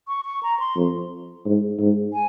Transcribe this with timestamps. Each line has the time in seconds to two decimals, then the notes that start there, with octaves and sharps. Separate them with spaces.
0.08 C#6
0.25 C#6
0.43 A#5
0.59 C6
0.76 F2
1.45 G#2
1.79 G#2
2.13 G#5